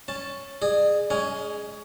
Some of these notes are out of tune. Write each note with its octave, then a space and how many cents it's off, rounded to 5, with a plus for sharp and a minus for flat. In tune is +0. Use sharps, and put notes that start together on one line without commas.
C#4 +0 A5 +0
G#4 +0 D5 +45
G#3 +5 C#4 +25 G#5 +0